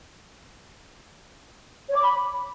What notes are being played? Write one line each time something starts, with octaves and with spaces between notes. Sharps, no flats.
C#5
D6
B5